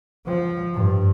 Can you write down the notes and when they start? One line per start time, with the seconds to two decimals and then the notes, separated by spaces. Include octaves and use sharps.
0.24 F3
0.75 G2